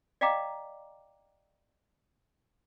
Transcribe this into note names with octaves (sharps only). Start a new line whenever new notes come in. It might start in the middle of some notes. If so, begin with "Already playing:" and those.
D5 D#5 F5 G5 A#5 D6